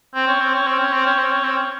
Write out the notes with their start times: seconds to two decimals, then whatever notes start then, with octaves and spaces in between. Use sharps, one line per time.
0.15 C4
0.27 C#4
0.41 C4
0.54 C#4
0.67 C4
0.79 C#4
0.93 C4
1.06 C#4
1.19 C4
1.32 C#4
1.44 C4
1.57 C#4